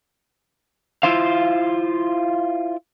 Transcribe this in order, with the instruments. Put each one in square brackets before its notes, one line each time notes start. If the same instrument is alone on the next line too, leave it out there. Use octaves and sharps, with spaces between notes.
[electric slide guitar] E4 F4 C5 F5